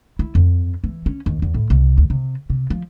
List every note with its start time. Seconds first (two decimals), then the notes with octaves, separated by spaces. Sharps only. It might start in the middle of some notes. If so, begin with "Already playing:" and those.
0.19 E4
0.35 F2
0.84 E3
1.06 C#4
1.26 D#2
1.42 E2
1.54 A2
1.70 C2
1.98 D2
2.10 C3
2.50 C3
2.70 F3